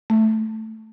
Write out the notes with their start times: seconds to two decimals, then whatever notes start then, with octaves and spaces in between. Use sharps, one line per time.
0.10 A3